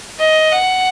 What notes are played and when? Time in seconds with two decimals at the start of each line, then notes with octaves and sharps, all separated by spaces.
0.19 D#5
0.52 F#5